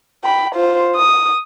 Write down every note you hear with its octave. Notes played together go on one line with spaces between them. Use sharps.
G5 B5
F4 C5
D#6